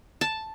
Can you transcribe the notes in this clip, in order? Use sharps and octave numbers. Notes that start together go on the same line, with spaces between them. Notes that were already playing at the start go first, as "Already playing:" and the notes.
A5